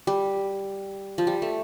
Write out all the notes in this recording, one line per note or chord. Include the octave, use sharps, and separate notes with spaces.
G3
F3
G3
A3